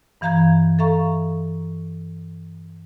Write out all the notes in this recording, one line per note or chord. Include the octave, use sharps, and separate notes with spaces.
G2 E3 F5 A#5 G6 G#6
A4 E5 F5 A#5 C#6